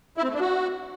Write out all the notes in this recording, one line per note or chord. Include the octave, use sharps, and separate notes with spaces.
E4
C4
A3
D4
F#4